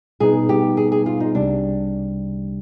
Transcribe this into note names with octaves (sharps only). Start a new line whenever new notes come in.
B2 G3 B3 D#4 G#4 B4
G4
G#4
G#4
F4
D#4
C2 C3 G3 D4